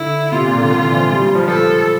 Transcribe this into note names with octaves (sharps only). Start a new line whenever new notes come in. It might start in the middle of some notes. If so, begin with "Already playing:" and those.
Already playing: D3 E4
C3 F4
A#2
D3
D3
E3
F3
G3
G3
F3
F3 A4